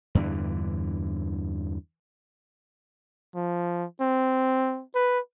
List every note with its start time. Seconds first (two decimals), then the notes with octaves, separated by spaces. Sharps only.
0.15 E2 G2 D3 E3
3.35 F3
4.00 C4
4.95 B4